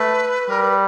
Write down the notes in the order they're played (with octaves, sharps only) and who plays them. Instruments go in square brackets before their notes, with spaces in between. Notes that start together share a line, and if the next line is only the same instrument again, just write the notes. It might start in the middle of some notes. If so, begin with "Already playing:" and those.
Already playing: [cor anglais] A3 [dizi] B4
[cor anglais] G3 [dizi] A#4
[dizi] B4